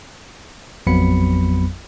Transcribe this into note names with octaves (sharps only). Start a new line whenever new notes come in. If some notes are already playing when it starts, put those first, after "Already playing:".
A1 F2 F#3 B3 B5 C#7